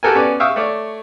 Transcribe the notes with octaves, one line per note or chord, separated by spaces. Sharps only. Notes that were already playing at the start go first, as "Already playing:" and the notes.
F#4 G4 A4 A#4 G#5
B3 C#4 D5
E5 F5 G5 C#6 D#6 E6
A3 C#5 D5